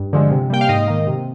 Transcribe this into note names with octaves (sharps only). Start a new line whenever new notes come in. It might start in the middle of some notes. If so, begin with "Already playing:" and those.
Already playing: G2
D3 F3 G#3
C3
G3 A#3 G5
F5
G#2 D#5
D#3 A#3
C3